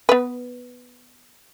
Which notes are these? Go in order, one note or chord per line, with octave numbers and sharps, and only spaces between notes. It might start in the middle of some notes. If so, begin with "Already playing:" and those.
B3 B4